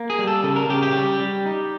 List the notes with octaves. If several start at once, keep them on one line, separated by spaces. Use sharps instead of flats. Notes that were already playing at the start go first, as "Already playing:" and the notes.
Already playing: A#3
G#4
G3
A4
C#3 A4
A#4
C#3 G4
G4
G3
G3
D#4